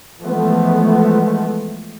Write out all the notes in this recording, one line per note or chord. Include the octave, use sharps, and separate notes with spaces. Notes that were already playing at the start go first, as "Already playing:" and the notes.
E3 F3 G#3 A3 B3